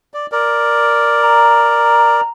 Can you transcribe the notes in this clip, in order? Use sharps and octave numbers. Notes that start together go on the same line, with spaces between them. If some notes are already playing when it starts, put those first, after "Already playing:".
D5
A#4 D5
A#5